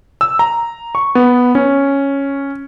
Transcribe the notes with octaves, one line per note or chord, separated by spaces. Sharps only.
E6
A#5
C#6
B3
C#4